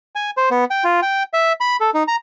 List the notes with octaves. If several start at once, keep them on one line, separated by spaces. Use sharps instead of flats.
G#5
C5
B3
G5
F4
G5
E5
B5
A4
D#4
A#5